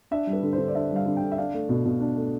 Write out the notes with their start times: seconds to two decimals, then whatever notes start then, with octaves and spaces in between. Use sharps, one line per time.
0.11 D4 E5
0.27 G3
0.33 B4
0.43 D3
0.53 C5
0.58 D3
0.68 D5
0.75 D4 E5
0.91 G3
0.96 F5
1.06 D3
1.17 G5
1.22 D3
1.32 E5
1.38 D4 F5
1.54 A3
1.69 B2
1.86 B2
2.00 D4
2.16 A3